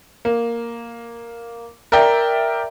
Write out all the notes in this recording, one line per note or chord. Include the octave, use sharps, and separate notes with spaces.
A#3
A#4 D5 E5 G5